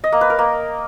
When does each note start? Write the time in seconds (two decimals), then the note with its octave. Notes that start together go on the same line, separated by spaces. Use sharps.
0.04 D#5
0.12 A#3
0.21 B4
0.30 A#4
0.39 A#3